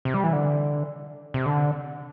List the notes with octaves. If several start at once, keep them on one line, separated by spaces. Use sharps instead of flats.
C3
G3
E3
D3
C3
D3